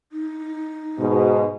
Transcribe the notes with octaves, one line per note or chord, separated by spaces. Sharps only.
D#4
G#2 B2